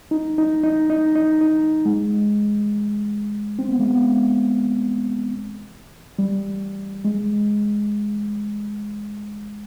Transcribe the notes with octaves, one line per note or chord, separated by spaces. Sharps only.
D#4
D#4
D#4
D#4
D#4
D#4
G#3
C4
B3
G#3
B3
G3
G#3